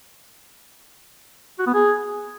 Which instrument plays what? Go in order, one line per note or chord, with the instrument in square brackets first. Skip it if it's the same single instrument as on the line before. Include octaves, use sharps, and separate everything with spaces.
[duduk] F#4
B3
G#4